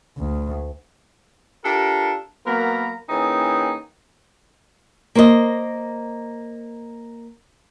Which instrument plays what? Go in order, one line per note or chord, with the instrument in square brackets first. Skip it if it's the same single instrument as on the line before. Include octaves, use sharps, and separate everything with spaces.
[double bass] D2
[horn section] D4 F4 G4 A4 A#4
F#3 A#3 B3 A#4 A#5 B5
E3 A#3 C#4 D#4 G#4 G5
[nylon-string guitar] A#3 C5 D#5